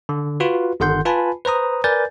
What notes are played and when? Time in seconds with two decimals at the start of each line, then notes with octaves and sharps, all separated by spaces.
0.09 D3
0.40 F4 F#4 B4
0.80 G1 D#3 A4 F#5 C6 G6
1.05 F4 B4 G#5 A5 B5
1.45 B4 C5 A#5 D#6
1.84 A#4 B4 D5 G#5 G6 A6